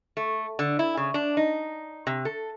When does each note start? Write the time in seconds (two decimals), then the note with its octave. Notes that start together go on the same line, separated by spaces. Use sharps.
0.17 A3
0.59 D3
0.79 E4
0.97 C#3
1.14 D4
1.37 D#4
2.07 C3
2.25 A4